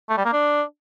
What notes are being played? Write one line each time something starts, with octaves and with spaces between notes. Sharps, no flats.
A3
G3
A#3
D4